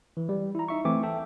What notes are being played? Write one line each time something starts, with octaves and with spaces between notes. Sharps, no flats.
E3
G3
E4 A#5
D#4 E5 C#6
E3 A3 C4 E5 G#5 D6
A4 E5 G5 A5